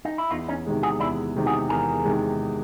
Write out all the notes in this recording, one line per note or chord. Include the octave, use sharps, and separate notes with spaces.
D#4
E4
E2 D#4 F4
C#4 D#4
C3 D#3 G#3
F#4 G#4
E2 D4 E4
C3 D#3 G#3
F#4 G#4
E2 G#4 A#4
C3 D#3 G#3